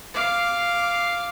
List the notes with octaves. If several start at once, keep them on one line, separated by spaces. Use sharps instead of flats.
F5 D6